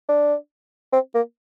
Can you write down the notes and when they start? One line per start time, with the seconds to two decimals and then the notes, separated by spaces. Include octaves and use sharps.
0.09 D4
0.93 C4
1.15 A#3